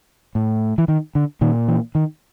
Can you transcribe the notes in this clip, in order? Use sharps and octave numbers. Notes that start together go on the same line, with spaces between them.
A2
E3
D#3
D3
A#2 D#3
E3
D#3